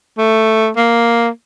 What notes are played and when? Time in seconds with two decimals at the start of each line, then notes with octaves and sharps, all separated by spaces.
0.18 A3
0.76 A#3